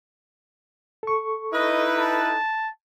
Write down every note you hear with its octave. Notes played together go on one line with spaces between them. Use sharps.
A4 C#6
D#4 E4 B4 D#5
A5